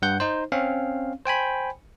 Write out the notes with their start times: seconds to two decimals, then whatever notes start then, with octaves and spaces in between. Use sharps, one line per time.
0.02 G2 F#5 G6
0.20 D#4 C5
0.52 C4 C#4 F5
1.26 C5 G5 G#5 B5